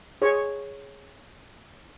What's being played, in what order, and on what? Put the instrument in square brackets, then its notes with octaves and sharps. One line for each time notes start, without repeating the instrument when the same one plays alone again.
[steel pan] G#4 C#5